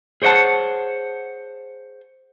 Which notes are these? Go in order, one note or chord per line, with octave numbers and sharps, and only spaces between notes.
G#4 C5 C#5 D#5 F#5 A5